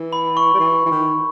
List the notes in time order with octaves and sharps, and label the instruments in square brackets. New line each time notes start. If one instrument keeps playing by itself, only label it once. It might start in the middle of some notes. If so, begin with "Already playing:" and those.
Already playing: [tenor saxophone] E3
[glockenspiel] B5
C#6
[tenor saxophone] G3
E3
E3
D#3